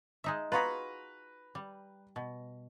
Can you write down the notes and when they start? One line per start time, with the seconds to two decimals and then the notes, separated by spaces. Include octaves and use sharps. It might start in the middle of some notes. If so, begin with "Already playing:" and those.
0.24 G#3 D#4 E5
0.52 F4 F#4 G#4 B4 A#5 B5
1.55 G3
2.16 B2